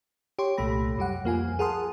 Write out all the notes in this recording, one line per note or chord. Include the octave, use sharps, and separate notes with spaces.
G4 C#5 C6
C2 A#2 A3 B5 A#6
F#2 G3 G4 F#5
F2 A#3 F4 G#5
G#4 A#4 F#5 A5 C6 D#6